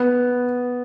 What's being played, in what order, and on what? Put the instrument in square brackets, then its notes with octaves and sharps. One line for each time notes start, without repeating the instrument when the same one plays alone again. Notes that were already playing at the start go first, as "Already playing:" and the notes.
Already playing: [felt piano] B3